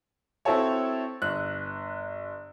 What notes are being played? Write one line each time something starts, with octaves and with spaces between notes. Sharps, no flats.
C4 E4 F#4 A4 C#5
G1 F#6